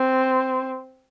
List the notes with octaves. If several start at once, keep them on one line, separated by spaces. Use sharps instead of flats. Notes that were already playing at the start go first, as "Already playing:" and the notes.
Already playing: C4